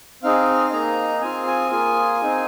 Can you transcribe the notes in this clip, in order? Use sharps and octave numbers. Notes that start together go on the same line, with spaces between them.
C4 D#4 G#4 F5
A#3 D#4 G#4 A#5
C4 F4 G#4 G#5
G#5
A#3 F4 G#4
C4 D#4 G#4